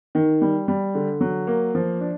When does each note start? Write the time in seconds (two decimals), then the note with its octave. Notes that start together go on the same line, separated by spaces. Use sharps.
0.15 D#3
0.42 G3
0.68 G3
0.95 D3
1.21 F#3
1.47 A#3
1.75 F3
2.01 D4